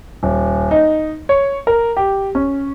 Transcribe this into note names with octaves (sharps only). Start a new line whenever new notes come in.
D#1
D#4
C#5
A#4
G4
C#4